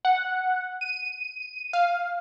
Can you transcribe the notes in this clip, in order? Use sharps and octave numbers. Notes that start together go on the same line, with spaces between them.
F#5
D#7
F5